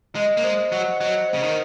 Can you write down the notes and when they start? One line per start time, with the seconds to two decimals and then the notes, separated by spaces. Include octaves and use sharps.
0.15 G#3 D#5
0.37 A#3
0.43 G#3 C5
0.72 F#3 F#5
1.00 F#3 D#5
1.29 C#3 C5
1.43 D#3